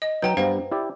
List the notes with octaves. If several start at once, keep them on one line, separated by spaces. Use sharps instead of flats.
D#5
F#3 D#4 B4 G5 A#5
G2 B3 C5 F5 G5 A#5
E4 G4 D5